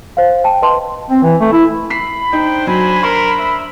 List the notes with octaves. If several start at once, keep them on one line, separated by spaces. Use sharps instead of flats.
C5 F5
G5 A5
B4 D#5 A5 C6
C4
E3
A3
E4
B5 B6 C7
D4 D#4 C5 G5
F#3 G#5 B5
A#4 C6
E5